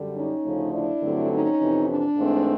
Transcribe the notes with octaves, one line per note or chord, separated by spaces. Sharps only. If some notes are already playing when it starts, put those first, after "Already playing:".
Already playing: F#2 D3 G3
C#4 D#4
D2 C#3 F3 A3
D4 E4
G2 D3 F#3 A3 C4
C#4 D#4
F2 C3 E3
D4
G#2 E3 A3 C4